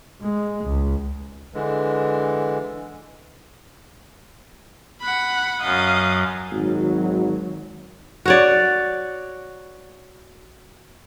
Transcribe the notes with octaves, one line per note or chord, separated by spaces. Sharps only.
G#3
C#2
D3 E3 G#3
F#5 B5
F#2 D#5 F5
G#1 D#3 F#3
F#4 C#5 D5